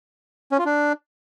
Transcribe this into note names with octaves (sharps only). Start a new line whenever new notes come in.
C#4
F4
D4